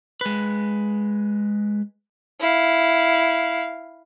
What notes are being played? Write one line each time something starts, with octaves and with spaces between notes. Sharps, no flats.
G#3 B4
E4 F5